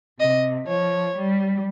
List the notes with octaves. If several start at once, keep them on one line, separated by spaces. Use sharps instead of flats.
C3 D#5
F3 C#5
G3